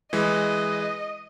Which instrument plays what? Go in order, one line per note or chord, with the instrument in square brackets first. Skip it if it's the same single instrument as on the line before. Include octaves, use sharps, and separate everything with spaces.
[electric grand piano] E3 G#3 [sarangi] D#5